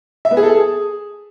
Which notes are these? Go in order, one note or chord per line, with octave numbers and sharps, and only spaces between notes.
E5
B3
G#4
A4
G#4